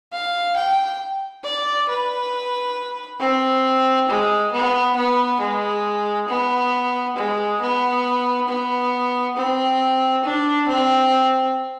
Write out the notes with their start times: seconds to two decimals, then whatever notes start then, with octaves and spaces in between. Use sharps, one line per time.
0.12 F5
0.57 G5
1.44 D5
1.89 B4
3.20 C4
4.09 G#3
4.53 B3
4.97 B3
5.40 G#3
6.28 B3
7.16 G#3
7.60 B3
8.48 B3
9.36 C4
10.24 D4
10.68 C4